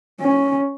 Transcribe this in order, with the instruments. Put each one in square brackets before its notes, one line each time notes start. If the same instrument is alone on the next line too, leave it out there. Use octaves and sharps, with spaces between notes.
[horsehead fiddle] C#4